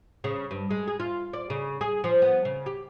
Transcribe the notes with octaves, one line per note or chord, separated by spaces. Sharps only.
C#3
G2
G#3
G#4
F4
D5
C#3
G#4
F3
B3
C#3
G4